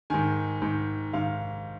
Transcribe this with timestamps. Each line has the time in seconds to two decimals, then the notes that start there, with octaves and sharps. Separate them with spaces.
0.10 G#2 D#3 G#5
0.62 G#2 D#3
1.13 G#2 D#3 F5